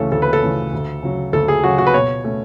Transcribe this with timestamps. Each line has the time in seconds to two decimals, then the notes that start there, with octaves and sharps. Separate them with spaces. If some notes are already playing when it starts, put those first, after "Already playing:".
Already playing: D2 C#3 E3 A3 C#4 A4
0.12 D2 A4
0.22 B4
0.33 A4
0.42 C#3 E3 A3 C#4
0.73 D2
1.03 C#3 F#3
1.33 D2 A4
1.48 G#4
1.64 C#3 F#3 F#4
1.78 F#4
1.87 B4
1.94 B2 C#5
2.24 A3 C#4